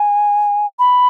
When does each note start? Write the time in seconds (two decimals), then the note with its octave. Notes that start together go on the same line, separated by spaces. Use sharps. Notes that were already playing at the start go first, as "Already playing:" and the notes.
Already playing: G#5
0.79 B5